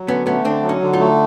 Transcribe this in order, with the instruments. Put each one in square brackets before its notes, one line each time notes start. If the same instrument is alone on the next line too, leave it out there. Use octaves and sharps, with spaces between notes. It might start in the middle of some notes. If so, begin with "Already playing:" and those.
Already playing: [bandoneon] F#3
[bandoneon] D3 [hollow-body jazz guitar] B3 C#4
[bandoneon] A3 [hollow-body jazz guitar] B3 C#4
[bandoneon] D3 [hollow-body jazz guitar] C4 D4
[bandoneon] F#3
[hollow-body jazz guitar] C#4 D#4
[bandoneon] D3
[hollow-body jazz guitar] D#4 F4
[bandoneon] A3